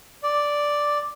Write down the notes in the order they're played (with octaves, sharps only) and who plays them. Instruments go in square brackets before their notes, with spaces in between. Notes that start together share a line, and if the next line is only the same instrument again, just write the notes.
[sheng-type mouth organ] D5